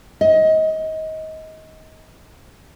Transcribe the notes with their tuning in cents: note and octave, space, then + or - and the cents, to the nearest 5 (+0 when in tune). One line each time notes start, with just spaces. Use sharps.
D#5 +25